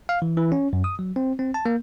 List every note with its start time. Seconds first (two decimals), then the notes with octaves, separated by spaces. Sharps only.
0.09 F5
0.22 E3
0.37 E3
0.52 C#4
0.73 F#2
0.84 D#6
0.99 F#3
1.16 C4
1.39 C4
1.54 A5
1.66 A#3